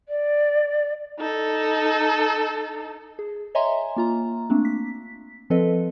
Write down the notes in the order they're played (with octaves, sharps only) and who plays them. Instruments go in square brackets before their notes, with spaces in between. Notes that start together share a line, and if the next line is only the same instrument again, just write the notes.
[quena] D5
[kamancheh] D#4 A4
[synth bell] G#4
C#5 D#5 E5 G#5 A#5 C6
A#3 F4 A#5
A3 A#3 C4 D4
B6
F3 C4 A4 B4 D#5